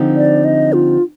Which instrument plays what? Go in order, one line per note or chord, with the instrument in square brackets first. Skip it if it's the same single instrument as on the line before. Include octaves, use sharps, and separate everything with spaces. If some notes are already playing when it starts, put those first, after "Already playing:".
Already playing: [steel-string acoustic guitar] D3 F3 C4 D#4 G4
[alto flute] D5
D#5
F4